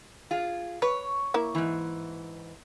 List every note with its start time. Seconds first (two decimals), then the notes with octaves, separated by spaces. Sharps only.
0.31 F4 G#4
0.82 B4 C#5
1.34 A#3 E4
1.55 G#2 E3